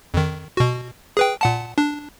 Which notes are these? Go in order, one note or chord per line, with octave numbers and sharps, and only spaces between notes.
F2 D#3
B2 F#4
G#4 B4 G5
A#2 F#5 A5
D4